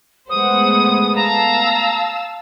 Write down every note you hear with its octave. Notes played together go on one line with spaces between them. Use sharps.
G#3 A3 B3 C5 F#5 D#6
F5 A5 A#5 E6